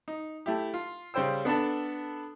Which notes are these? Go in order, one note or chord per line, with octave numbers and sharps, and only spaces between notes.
D#4
A3 E4 G4
F4
C#3 G3 C5 G5 E6
B3 D4 A4 A5